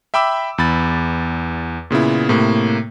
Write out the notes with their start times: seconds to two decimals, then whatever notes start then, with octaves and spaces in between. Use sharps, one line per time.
0.14 E5 G5 B5 D6 E6
0.58 E2 B5 A6
1.90 A#2 C#3 B3 E4
2.29 A2 C3 A#3